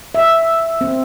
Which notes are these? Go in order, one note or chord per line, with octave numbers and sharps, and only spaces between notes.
E5
C4